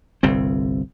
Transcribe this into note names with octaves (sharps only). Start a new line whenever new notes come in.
G1 C2 C4